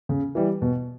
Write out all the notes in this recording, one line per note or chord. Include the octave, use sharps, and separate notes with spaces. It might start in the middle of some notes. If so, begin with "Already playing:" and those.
C#3
E3 G3
B2